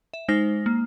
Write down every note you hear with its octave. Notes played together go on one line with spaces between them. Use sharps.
E5
G#3 D#4 C5 F6 A#6
A#3